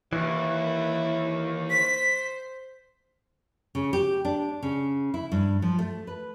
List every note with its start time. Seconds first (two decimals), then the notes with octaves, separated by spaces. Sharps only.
0.13 D#2 E3 E4
1.70 C5 B6
3.75 C#3
3.93 G4
4.25 D4
4.63 C#3
5.14 E4
5.32 G2
5.62 F3
5.79 A3
6.07 B4